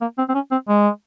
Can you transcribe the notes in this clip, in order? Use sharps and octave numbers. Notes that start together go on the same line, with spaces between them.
A#3
C4
C4
C#4
C4
G#3